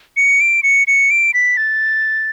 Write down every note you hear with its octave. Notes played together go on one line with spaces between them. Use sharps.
C#7
D7
C#7
C#7
D7
B6
A6